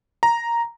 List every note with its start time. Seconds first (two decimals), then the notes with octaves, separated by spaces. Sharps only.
0.23 A#5